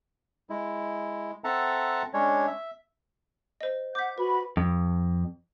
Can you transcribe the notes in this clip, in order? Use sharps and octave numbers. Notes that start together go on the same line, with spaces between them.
G#3 E4
C4 A4 E5 F#5 A5 A#5
G#3 C#4 D4 C#5
E5
C5 D#5
F#5 D6 G6 B6
F#4 B4 B5
F2